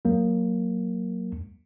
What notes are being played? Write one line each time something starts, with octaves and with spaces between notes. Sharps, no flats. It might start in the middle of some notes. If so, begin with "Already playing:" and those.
F#3 A#3